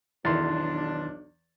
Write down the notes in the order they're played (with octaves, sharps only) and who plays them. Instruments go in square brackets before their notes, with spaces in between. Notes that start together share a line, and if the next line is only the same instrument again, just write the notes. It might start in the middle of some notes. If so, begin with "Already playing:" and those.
[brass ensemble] B1 D4 [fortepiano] E2 [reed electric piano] D#3 C6 A6